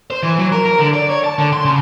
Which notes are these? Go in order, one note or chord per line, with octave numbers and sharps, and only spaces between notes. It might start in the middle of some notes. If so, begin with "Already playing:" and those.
C5
E3
F#3
A#4
A#4
D3
D5
C#5
A5
D3
C6
C#3